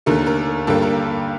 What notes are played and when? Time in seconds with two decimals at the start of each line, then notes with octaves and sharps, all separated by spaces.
0.06 D#2 D3 A3 A#4
0.26 A#4
0.67 G2 D3 G3 A#3 A4
0.82 A#4